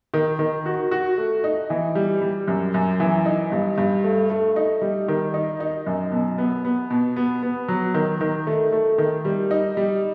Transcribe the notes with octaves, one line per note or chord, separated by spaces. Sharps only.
D#3
D#3
F#4
F#4
A3
D#4
E3
G3
G3
F#2
F#2
E3
D#4
G2
G2
A3
A3
D#4
G3
D#3
D#4
D#4
F#2
B2
B3
B3
B2
B3
B3
F#3
D#3
D#3
A3
A3
D#3
G3
D#4
G3